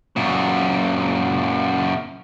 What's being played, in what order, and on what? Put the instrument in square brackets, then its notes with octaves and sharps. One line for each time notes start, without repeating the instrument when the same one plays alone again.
[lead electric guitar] F#2 A#2